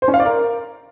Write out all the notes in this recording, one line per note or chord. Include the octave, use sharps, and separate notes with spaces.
C5
C#4
F5
D5
A#4